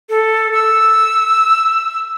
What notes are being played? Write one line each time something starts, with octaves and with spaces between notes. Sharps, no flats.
A4
E6